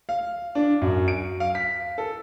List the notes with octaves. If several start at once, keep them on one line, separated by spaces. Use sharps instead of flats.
F5
D4
F#2
D7
F5
B6
A4